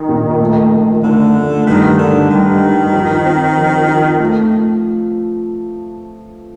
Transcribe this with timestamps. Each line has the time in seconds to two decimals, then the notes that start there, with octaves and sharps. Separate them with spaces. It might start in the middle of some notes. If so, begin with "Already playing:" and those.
Already playing: D#3 D#4
0.09 A#2
0.40 A3
0.72 F3
1.03 D3 A3
1.35 A3
1.67 G2 D#3
1.98 G2 D3
2.30 G2 D#3
2.62 G2
2.93 F3
3.25 C4
3.57 F3
3.88 F3
4.20 A3